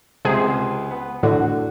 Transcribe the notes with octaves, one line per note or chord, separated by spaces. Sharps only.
C#2 C3 G#4 C5
B3
A2 D3 F#4